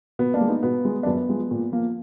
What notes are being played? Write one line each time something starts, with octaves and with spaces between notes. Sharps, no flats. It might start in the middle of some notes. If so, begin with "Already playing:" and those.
B2 B3
A#3 D4
G#3
B3 D#4
B2 B3
G#3
D4
F#2 B3
F3 G#3
A#2
F3 A#3